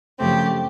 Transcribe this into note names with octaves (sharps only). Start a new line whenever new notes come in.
F#2 C#3 F3 A3 C4 G4